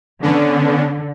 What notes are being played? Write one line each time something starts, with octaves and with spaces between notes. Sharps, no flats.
D3 B3 C#4 D4